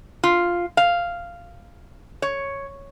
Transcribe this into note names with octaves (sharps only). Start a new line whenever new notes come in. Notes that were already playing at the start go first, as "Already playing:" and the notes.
F4
F5
C#5